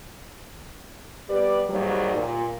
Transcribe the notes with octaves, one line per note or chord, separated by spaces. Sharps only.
G3 B3 G4 B4 D5
D#2 G#2 F#3 G3
A#2